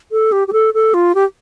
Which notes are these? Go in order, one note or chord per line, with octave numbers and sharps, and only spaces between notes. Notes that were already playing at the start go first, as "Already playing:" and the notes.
A4
G4
G4
A4
A4
F4
G4